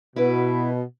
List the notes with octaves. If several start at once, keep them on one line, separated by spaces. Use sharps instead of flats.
B2 E4 B4